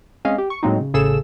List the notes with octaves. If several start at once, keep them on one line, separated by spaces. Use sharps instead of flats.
G#3 C4 C#4 D#5 F5
G4
C#6
A2 F#3 G#3 A#3 C4 D#4
C#3
A1 C#3 G#4 A4 E6 E7